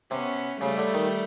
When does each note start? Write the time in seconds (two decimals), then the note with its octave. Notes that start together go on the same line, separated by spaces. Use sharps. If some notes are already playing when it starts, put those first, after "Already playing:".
0.11 C3 B3 C#4
0.61 C#3 G3 A3
0.78 D3
0.94 D#3